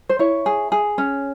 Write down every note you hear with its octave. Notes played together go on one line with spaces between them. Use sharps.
C5
E4 C#5
G#4
G#4
C#4